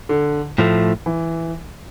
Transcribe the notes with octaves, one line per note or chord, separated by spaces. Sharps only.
D3
A2 F3 A3
E3